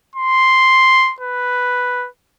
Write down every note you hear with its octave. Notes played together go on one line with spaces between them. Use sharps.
C6
B4